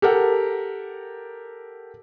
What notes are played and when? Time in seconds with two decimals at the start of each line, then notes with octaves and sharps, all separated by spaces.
0.02 G4 A4 A#4 F#5